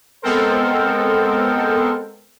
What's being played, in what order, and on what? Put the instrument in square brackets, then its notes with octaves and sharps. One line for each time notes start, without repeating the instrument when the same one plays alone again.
[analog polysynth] G#3 B3 C4 A4 A#4 C5